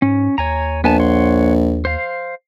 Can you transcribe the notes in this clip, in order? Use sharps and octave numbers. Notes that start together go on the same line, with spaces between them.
G#2 C#4
D#2 C#5 G#5 A#5
A#1 B3 G#5 A5
C#5 F#5 C6
C5 F5